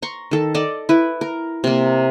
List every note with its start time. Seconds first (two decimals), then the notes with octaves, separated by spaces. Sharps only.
0.02 A#5 C6 C#6
0.31 D#3 A4
0.54 A4 D5 D#5 A5
0.89 E4 B4
1.21 A#4
1.64 C3 A#3